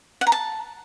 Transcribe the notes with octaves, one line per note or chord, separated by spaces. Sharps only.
F#5
A#5
A5